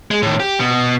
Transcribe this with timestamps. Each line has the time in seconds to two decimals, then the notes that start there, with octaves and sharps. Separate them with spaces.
0.11 G#3
0.23 A2 D#3
0.40 G4
0.60 B2